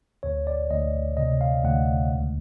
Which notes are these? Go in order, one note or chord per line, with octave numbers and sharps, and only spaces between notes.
D2 C#5
D5
D2 D#5
C3 D#5
F5
D2 F#5
C#2